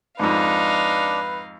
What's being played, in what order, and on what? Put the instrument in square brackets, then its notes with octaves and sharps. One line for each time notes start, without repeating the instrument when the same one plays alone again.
[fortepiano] F2 G#2 [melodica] D4 [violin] D#4 F5 [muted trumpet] B4